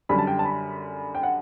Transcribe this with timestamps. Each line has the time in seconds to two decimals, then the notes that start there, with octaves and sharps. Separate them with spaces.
0.09 F#2 D3 G3 B5
0.18 A5
0.27 G5
0.39 A5
0.45 B5
1.15 G5
1.23 F#5